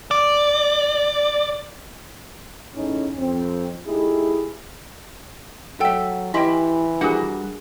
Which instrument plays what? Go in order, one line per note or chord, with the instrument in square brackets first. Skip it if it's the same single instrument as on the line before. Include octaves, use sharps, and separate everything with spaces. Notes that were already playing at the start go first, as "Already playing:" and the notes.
[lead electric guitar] D5
[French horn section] E2 A2 C#4 D#4
F2 C4
A3 D#4 E4 G4 G#4
[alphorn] F#3 [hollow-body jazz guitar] A4 E5 [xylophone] F#5 G5 E6
[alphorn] E3 [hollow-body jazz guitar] E4 G4 E5 [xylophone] D#5 G5 [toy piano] G#5 C6
[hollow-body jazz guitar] G3 F#4 F#5 [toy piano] D4 G#4 A#4